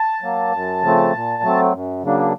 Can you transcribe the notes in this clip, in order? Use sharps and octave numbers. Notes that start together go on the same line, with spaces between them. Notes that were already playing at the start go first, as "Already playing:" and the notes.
Already playing: A5
F#3 A#3
F#2
C#3 F3 A3 C4
A#2
F#3 A3 C4
F#2
C#3 F#3 A#3 D4